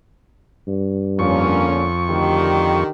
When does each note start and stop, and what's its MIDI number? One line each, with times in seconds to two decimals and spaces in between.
0.68 1.65 43
1.19 2.84 41
1.19 1.87 50
1.19 1.87 58
1.19 1.87 61
1.19 2.84 85
2.09 2.63 38
2.09 2.90 50
2.09 2.90 51
2.09 2.90 67